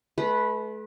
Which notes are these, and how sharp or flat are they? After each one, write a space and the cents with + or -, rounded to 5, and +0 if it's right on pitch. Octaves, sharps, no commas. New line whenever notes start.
A3 -40 B4 -5